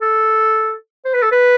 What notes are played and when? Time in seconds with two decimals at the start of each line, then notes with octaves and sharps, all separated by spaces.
0.01 A4
1.05 C5
1.14 B4
1.22 A4
1.32 B4